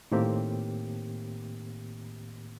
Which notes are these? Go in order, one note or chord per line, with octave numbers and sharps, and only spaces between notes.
A2 D#3 A#3 C4 G4